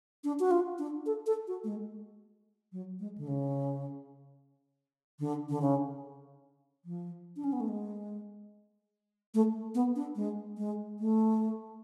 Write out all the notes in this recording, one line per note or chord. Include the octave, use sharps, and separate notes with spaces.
D4
F#4
F4
D4
A4
A4
F#4
A3
G#3
F#3
G#3
D3
C#3
D3
D3
C#3
F3
D4
C#4
B3
A3
G#3
A3
B3
D4
G#3
G#3
A3